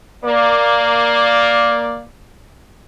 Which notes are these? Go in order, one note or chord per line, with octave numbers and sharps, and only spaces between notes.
A#3 D5